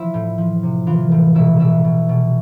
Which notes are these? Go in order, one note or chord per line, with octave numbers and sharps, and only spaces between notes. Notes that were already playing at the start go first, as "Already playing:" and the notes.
Already playing: F3 E4 E5
A2
F3
C3
E3 F4 F5
A2
B2 E4 E5
B2 E4 E5
B2
B2